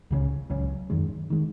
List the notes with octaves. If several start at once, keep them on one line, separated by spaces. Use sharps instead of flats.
C#2 C#3 F#3 C#4
C#2 C#3 F#3 C#4
F#2 D#3 G#3
D#3 G#3